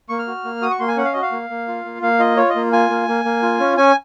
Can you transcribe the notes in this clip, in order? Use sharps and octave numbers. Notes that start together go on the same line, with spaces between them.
A#3 C#6
F6
F#4
A#3
F#4 D#6
C#6
A#3 C6
G#5
C#4 F#5
F5
F#4 D#5
F5
A#3
A#3
F4
A#3
A#3 F5
F4 D#5
F4 C#5
D#5
A#3
F4 G#5
A#3
A#3
A#3
F4
C#4
C#4 G#5